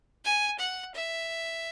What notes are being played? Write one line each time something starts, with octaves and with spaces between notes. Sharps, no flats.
G#5
F#5
E5